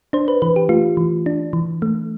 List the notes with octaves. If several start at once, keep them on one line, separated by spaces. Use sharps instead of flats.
D4 C5
B4
E3 B4
G4
A3 F4
E3
D4
E3
A3